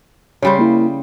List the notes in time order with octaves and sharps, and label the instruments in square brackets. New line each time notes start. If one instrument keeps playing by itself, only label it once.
[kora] C#3 G3 C5 [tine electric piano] C#5
[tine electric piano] A#3 E4